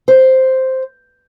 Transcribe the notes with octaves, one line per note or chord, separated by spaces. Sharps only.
C5